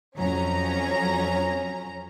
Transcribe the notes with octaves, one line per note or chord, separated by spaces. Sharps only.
F2 F#3 C#4 A#5